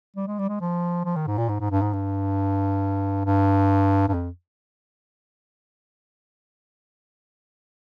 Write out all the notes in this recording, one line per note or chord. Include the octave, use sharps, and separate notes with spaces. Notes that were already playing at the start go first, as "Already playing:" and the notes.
G3
G#3
G3
G#3
F3
F3
D#3
G#2
A#2
G#2
G#2
G2
G#2
G2
G2
G2
F2